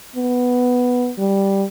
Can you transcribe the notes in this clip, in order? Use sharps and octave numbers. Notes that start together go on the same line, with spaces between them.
B3
G3